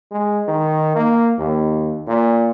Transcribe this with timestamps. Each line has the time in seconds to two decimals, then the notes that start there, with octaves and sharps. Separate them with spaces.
0.12 G#3
0.48 D#3
0.96 A#3
1.38 D#2
2.07 A#2